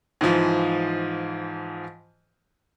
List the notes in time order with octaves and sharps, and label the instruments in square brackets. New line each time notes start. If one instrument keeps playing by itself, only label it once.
[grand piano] G#2 E3 F3